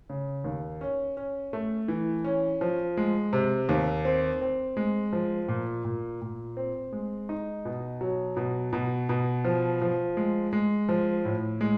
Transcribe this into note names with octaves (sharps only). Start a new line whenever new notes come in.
C#3
D#2
C#4
C#4
A3
E3
C#4
F3
G#3
C3
D#2
C4
C4
G#3
F3
A#2
A#2
A#2
C4
G#3
D#4
B2
F#3
B2
B2
B2
F3
F3
G#3
G#3
F3
A2
G#3